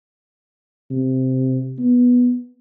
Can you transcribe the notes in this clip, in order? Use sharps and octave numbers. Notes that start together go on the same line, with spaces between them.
C3
B3